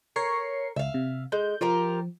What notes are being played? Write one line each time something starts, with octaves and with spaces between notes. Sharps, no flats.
A#4 C#5 C7 C#7
C#2 E5 F5
C3
G#3 G6
F3 F4 G4 A#4